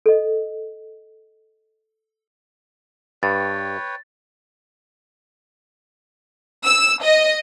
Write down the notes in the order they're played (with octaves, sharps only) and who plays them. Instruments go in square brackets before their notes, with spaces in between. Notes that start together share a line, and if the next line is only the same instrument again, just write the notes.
[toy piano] A4 D#5
[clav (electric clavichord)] G2 [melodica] B4 C#5 G5 [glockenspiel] A6
[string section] E6
D#5